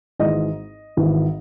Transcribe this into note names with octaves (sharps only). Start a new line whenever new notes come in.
G#1 G#2 E3 D#5
G#1 G#2 E3